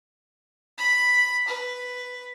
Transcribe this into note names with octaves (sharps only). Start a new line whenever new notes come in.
B5
B4